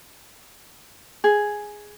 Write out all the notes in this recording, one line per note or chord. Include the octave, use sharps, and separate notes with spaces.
G#4